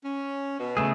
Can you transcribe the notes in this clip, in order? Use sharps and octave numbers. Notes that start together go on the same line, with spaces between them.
C#4
B2
C#3 A3 G#4